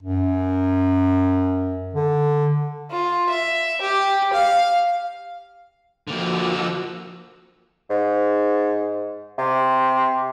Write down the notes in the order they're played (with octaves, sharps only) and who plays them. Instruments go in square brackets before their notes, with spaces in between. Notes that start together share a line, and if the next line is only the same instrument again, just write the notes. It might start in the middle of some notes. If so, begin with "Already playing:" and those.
[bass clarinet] F#2
D3
[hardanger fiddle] F4
E5
G4
F5
[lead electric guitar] D3 A#3 [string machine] F3 F#4 E6
[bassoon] G#2
C3